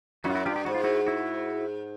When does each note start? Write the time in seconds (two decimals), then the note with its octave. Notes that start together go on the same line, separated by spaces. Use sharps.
0.24 F#2 E4 F#4
0.30 F4
0.35 E4 F#4
0.45 G2 F4 G4
0.56 G4
0.65 G#2 F#4
0.75 F4
0.84 E4 F#4
1.07 E4 F#4